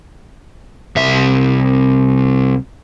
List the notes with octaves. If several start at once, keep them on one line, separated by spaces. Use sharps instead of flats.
C2 E5